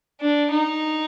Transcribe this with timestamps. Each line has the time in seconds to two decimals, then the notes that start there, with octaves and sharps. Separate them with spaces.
0.21 D4
0.51 D#4